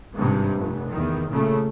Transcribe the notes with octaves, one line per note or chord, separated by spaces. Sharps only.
G#1 G2 C3
F1
E2 D#3
A#2 C#3 A3